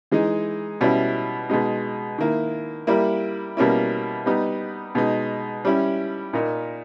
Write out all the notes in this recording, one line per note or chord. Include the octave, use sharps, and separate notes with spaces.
E3 G#3 D#4
B2 G3 C#4 E4
B2 G#3 D#4
D#3 A#3 E4
G3 A#3 E4
B2 G3 A#3 C#4 E4
G3 B3 D#4
B2 G#3 D#4
G3 C#4 E4
A#2 A#3 D#4